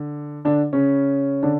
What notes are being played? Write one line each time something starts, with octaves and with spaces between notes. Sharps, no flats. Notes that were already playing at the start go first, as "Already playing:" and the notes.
Already playing: D3
D3 D4
C#3 C#4
D3 D4